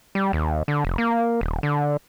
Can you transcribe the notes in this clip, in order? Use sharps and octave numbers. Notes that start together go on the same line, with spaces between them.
G3
D#2
D3
F1
A#3
D#1
D3